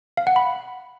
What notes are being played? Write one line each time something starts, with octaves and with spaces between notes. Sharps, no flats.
F5
F#5
B5